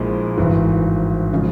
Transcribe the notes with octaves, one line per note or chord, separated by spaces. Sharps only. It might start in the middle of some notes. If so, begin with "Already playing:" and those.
Already playing: A#1 A#2 G#3 E4
G#1 G2 E3
C#3 F3 G#3